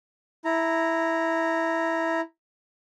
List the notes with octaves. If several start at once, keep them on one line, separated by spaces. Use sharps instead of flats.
E4 A#5